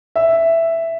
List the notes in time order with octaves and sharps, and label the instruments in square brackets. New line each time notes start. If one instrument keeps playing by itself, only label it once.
[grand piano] E5